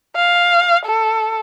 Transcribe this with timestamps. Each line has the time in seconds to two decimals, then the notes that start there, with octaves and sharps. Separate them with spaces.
0.15 F5
0.86 A4